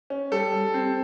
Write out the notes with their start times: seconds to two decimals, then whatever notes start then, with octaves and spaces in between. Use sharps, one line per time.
0.10 C#4
0.31 G3 A4
0.54 G3
0.74 C4